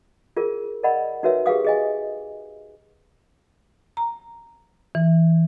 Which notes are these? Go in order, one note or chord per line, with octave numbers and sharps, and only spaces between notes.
F4 G#4 A#4
A#4 D5 D#5 F#5 B5
D#4 F#4 A#4 B4 C#5 E5
G4 G#4 B4 F5 D#6
G#4 D#5 G#5
A#5
E3